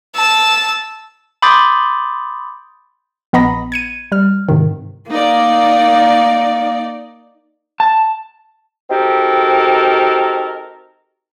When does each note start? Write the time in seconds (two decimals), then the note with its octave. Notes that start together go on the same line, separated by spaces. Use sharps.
0.16 A5 E6
1.42 B5 C6 D6 D#6 G6 A6
3.33 A#1 B3 D#5 A#5 B5 A#6
3.72 G#6 C#7 D#7
4.12 G3 F6
4.49 G#2 C3 D#3
5.10 A#3 D#4 D5
7.80 A5
8.90 C4 D#4 F#4 G4 A4 A#4